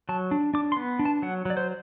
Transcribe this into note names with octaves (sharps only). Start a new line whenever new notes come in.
F#3 A5
D4
D4 D6
C6
B3
D4
A5
F#3 F#5
F#3 D5
C5